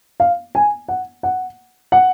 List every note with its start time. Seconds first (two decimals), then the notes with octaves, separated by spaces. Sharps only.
0.20 F5
0.55 G#5
0.88 F#5
1.23 F#5
1.92 F#5